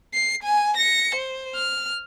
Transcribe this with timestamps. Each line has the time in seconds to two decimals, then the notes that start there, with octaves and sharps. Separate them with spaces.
0.14 C7
0.43 G#5
0.77 A#6 C#7
1.15 C5
1.55 F6